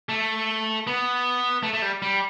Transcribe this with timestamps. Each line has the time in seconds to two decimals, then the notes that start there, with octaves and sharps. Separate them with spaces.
0.09 A3
0.87 B3
1.63 A3
1.73 A3
1.82 G3
2.02 G3